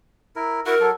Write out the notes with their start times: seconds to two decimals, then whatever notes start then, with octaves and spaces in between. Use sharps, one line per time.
0.36 E4 A#4
0.66 E4 F#4 A#4 F#5
0.80 F#3 A4